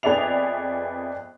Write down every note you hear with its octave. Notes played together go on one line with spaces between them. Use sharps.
F2 B3 G#4 D5 E5 F7